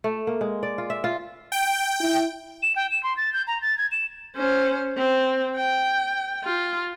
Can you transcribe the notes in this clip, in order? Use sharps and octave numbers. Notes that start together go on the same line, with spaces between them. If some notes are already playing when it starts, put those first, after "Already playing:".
A3
A#3
G#3
D5
F4
E5
F4
G5
E4
E7
G5
E7
C6
A6
G6
A#5
A6
G#6
E7
C#4 C5
C4
G5
F4